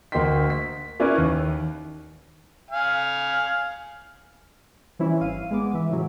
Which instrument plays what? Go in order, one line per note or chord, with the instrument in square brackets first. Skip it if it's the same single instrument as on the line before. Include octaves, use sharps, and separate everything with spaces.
[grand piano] D2 A#3 D#5 G5 C6 B6
B6
A#3 C#4 E4 B4 D5
D#2
[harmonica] F5 G#5
[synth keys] E3 G3 C4 C#4 E4
G#1 F5 D#7
G#3 B3 D6
E3 E5
A2 C#3 E3 F#3